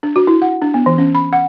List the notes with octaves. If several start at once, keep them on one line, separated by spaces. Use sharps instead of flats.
D4
F#4
E4
F#5
D4
B3
E3
C#4
B5
F#5